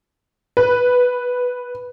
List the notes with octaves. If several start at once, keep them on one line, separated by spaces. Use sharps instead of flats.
B4